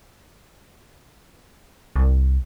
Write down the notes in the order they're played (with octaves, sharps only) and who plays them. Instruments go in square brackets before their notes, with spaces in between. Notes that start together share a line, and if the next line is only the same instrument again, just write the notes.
[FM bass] C2